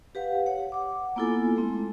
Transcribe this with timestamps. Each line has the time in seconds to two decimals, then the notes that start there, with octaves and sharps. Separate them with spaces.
0.15 G4 B4 F5 F#5
0.46 C#5 F#5
0.72 F#5 D6
1.16 A#3 B3 E4 F4 A4 G#5
1.56 G#3 A3 C4 E4